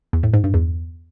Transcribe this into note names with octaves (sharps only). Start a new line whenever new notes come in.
E2
A2
G#2
G2
E2